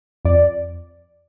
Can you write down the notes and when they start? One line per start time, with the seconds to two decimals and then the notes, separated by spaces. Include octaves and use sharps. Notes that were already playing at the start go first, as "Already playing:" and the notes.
0.25 F2 D5